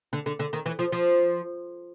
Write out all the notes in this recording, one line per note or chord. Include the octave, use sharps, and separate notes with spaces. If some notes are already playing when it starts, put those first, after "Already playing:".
D3
D3
D3
D#3
E3
F3
F3